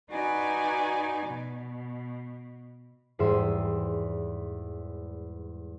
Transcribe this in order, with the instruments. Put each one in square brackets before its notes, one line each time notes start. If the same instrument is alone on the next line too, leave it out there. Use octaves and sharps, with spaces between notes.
[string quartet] D#4 F#4 B4 D5 G#5
B2
[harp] E2 G#2 G3 E5 C6 D#7